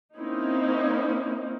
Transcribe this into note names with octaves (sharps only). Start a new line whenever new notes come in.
A#3 C4 C#4 D#4 E4